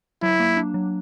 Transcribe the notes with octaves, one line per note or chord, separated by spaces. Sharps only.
F#3 E4
A#3
D4
F#3